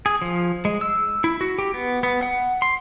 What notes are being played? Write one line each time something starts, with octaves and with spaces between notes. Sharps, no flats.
G#4
F3
G#3
E6
E4
F#4
G4
B3
B3
F#5
C6